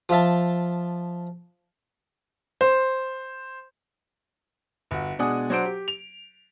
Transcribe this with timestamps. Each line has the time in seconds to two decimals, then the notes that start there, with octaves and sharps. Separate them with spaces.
0.09 F3 F4 E5 A5
2.61 C5
4.91 G1 F#4
5.19 B2 G#3 D4 F#5 G#5 D#6
5.50 F#3 D4 C5 F#5 D7
5.65 G4
5.88 F7